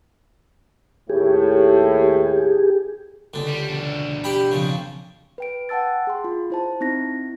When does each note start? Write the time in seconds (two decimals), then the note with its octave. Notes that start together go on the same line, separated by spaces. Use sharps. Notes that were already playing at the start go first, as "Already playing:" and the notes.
1.10 D#2 A2 G4 G#4
3.34 C#2 D3
3.48 G3
3.69 B2 D4
4.24 G4 G5 B5
4.51 F2 C#3
5.38 B4 G5 D7
5.69 F#5 G5 A5 E6 A6
6.07 G#4 C6
6.24 F4
6.50 E4 C5 A5
6.81 C4 D#4 E4 A#6